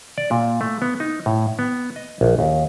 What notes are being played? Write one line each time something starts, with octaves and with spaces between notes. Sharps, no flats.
D5
A#2
A3
B3
D#4
A2
B3
D#5
A#1
D#2